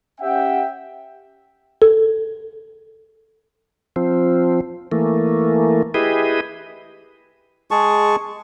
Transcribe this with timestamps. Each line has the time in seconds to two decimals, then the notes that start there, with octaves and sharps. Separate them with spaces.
0.21 C#4 G4 E5 F#5 G5
1.82 A4
3.96 F3 C4
4.92 E3 A3 A#3
5.94 E4 G4 G#4 B4 D#5
7.71 G#3 G#4 A5 C#6